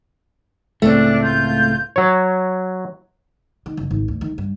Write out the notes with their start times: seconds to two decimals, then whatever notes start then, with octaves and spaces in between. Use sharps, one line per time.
0.82 C#2 A2 A3 C4 D4
1.22 F4 G6
1.96 F#3 C#5
3.66 D#3
3.77 F#1
3.91 G#1
4.08 D2
4.21 D#3
4.38 G2